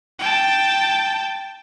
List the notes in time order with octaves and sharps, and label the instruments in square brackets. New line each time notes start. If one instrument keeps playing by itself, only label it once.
[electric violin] G5 A5